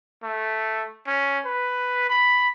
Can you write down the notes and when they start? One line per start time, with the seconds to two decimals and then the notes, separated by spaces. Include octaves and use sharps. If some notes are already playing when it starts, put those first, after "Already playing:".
0.23 A3
1.07 C#4
1.45 B4
2.09 B5